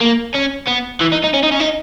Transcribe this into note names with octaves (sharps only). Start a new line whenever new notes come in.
A#3
C#4
B3
E3
D#4
D#4
C#4
D#4
C#4
D#4